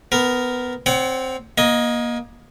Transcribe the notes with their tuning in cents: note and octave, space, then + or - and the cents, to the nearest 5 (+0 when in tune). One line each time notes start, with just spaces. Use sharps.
B3 +15 A#4 +0
C4 +0 C#5 +35 F#5 +25
A#3 +30 D#5 +0